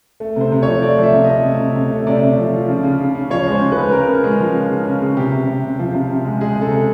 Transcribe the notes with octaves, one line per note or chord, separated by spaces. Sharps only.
A3
C3 C5
C3
F3 C#5
A3 D5
F3 E5
C3
A3 D#5
C3
C3
C3
A3
C3 D5
C3
F3
F3
C#3
C#3
C#3
C#3
F3 C#5
G#3
C5
C#3
B4
G#3
C#3 A#4
C#3
G#3
F3
C#3
C#3
C#3
C#3
C3 G4
C3
C3
C3
F3
C3
C3
G#3
G#3 G#4
C3
A4
C3